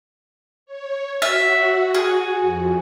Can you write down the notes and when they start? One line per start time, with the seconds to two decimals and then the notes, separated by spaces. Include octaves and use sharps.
0.66 C#5
1.22 F#4 E5
1.95 G#4
2.40 F2